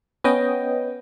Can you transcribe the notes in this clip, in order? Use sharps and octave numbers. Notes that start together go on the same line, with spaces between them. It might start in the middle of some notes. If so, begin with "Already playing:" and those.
B3 C#4 D#5 G5